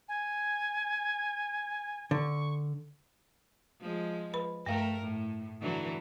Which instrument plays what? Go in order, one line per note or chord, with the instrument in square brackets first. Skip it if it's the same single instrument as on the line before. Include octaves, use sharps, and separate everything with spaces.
[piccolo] G#5
[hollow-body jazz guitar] D3 [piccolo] C#6
[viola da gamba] F3 G#3
[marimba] B4 B5
[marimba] G2 F5 G5 [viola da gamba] A3 A#4
[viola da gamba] A2
D3 E3 F#3